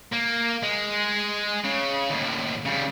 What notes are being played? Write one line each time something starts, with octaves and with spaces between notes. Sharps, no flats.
A#3
G#3
C#3
D#2 A2
C#3 G3